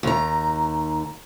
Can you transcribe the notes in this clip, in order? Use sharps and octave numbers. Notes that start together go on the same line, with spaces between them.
D#2 A#5